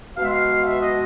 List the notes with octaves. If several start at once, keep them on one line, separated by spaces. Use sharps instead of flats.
B2 G#3 E5 F5
F5
E5
D#5